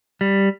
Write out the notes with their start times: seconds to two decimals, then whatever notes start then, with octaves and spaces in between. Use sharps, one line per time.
0.21 G3